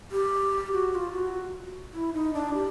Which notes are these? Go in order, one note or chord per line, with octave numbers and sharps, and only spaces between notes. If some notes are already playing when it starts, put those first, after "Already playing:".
G4
F#4
F#4
F4
F#4
E4
D#4
D4
G4